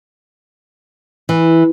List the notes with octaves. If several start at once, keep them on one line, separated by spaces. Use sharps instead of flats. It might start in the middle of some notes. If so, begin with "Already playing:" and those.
E3